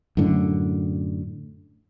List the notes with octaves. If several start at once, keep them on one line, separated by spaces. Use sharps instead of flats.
F#2 A2 D3